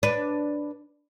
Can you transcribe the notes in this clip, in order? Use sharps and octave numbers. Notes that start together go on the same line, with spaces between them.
D4 B4